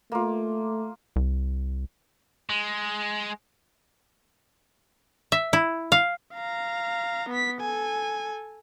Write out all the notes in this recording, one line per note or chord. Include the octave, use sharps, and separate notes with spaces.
A3 A#3 F4
C2
G#3
E5
E4
F5
F5 A#5
B3 B6
A4 G#5